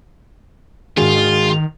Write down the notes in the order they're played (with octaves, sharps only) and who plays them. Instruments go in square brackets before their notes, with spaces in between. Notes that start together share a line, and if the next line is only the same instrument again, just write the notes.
[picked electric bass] G#2 D4 [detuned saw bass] D#3 [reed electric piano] G#3 F#4 G#4 [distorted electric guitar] F4